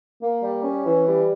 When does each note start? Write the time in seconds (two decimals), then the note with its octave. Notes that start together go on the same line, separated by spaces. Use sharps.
0.21 A#3
0.42 G3
0.63 C#4
0.85 E3
1.07 G3